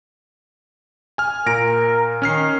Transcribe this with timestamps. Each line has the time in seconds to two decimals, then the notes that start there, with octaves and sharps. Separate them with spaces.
1.18 G#5 F6
1.46 A#2 A#4 A#6 D7
2.22 D#3 C#4 F6 C7